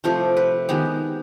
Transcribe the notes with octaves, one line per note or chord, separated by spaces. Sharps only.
C3 F3 A3 C5
B4
D#3 G#3 B3 G4